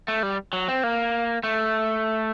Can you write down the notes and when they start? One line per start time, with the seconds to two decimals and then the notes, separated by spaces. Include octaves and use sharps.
0.08 A3
0.23 G3
0.53 F#3
0.68 C4
0.83 A#3
1.43 A3